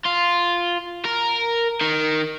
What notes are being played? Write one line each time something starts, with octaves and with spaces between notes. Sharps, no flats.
F4
A#4
D#3